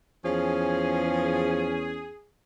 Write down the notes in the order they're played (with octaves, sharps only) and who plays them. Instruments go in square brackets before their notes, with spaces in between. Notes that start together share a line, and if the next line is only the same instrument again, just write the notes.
[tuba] E2 [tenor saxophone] F3 [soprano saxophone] C#4 [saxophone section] G#4